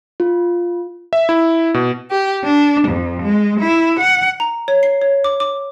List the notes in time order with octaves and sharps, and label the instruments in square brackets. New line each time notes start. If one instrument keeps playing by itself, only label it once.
[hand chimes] F4
[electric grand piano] E5
E4
B2
[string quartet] G4
D4
F2
G#3
E4
F#5
[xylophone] A#5
C#5
C7
C#5
D6
D6